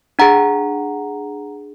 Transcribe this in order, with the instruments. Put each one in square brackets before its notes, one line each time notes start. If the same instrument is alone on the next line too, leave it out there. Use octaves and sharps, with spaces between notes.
[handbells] D4 G#4 F#5 A#5